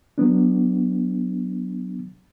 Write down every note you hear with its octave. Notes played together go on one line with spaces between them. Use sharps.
F#3 B3 D4